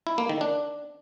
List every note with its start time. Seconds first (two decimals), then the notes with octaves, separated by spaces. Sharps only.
0.07 E4
0.18 A#3
0.29 D#3
0.41 D4